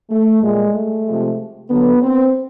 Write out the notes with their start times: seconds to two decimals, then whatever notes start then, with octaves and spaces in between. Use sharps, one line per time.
0.11 A3
0.42 A#2 G3 G#3
0.74 A3
1.06 C3 F3 G#3
1.69 D3 F#3 B3
2.02 C4